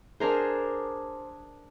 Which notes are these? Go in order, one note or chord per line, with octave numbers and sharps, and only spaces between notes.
D4 G#4 A#4 C5